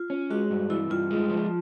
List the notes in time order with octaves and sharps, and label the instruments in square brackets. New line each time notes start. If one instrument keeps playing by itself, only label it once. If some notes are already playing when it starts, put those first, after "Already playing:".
Already playing: [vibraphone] F4
[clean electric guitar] C#4
[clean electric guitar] G#3 [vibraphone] F#4
[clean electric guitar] G2
[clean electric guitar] E3 [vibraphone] E4
[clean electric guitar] G2 [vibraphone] F4
[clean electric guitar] G#3
F3